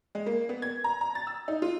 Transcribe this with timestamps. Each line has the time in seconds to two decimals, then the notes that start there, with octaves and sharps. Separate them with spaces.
0.15 G#3
0.26 A#3
0.49 B3
0.62 G#6
0.84 A#5
1.01 A#5
1.15 A6
1.27 E6
1.48 D#4
1.62 F4